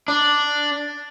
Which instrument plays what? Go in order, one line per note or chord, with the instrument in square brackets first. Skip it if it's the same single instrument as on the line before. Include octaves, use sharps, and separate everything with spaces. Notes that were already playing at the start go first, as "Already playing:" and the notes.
[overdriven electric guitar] D4